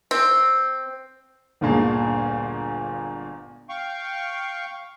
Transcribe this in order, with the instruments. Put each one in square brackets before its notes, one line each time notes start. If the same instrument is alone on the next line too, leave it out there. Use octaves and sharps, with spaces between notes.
[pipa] C4
[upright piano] G1 D2 A#2 G#3 A#3 A5
[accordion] F5 G5 C#6